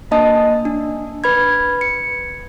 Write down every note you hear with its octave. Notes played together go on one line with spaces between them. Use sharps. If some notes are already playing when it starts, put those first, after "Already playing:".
A#3 D4 D#5 A5 D#6
D4
B4 B5 G#6
C#7